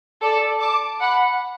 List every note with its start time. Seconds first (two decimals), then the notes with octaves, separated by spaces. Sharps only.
0.21 A4 D5
0.61 A5 D6
1.00 F#5 B5